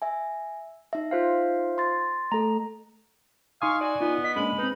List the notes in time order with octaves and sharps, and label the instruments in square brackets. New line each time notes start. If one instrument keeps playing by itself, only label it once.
[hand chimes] E5 G#5
D#4 E5
[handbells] F4 C5 F5
[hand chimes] C6 A6
[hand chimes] A3 A4 [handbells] A#5
[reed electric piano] D#4 C6 D#6 [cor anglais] F5 [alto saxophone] G#5 [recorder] C#6
[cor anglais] F#4 [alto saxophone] D5 [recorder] G#5
[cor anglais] B3 [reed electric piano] D#4 F4
[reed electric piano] D#5 [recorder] B6
[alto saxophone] G#3 [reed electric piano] A#3 C#4 D4 [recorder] B5
[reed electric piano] C4 B4 [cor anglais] D#4